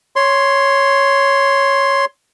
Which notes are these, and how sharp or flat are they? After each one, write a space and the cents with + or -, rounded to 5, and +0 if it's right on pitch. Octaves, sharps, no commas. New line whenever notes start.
C#5 +0 C6 +5